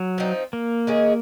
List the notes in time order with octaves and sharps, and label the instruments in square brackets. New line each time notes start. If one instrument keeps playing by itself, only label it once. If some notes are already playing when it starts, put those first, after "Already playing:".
Already playing: [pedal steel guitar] F#3
[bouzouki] F3 C4 D#4
[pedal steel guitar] A#3
[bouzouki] D#3 G#3 C#4 G#4